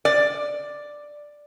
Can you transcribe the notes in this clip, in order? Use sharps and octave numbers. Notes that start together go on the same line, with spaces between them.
D5